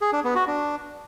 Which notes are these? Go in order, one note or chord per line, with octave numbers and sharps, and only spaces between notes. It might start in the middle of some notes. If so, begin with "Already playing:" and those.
G#4
D4
B3
F#4
D4